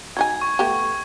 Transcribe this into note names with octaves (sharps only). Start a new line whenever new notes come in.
F#3 D#4 G#5 G#6
C#6
A3 B3 G4